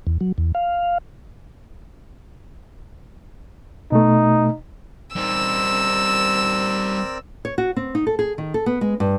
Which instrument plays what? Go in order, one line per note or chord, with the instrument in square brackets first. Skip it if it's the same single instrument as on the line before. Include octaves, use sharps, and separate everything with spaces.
[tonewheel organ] E2
F#3
E2
F5
[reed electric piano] B2 A3 [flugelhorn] D#4
[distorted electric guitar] G3 D#4 [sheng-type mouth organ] C4 A#4 D5 [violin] E6
[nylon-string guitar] C#5
F#4
C4
D#4
A4
G#4
D#3
A4
B3
G#3
G2